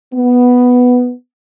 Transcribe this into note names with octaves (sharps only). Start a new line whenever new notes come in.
B3